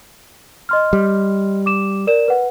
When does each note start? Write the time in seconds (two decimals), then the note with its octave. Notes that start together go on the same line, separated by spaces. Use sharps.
0.69 D#5 C6 F6
0.93 G3
1.66 D6 E7
2.07 A#4 D5 E7
2.28 B4 F#5